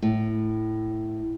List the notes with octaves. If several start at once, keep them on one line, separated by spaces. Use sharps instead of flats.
A2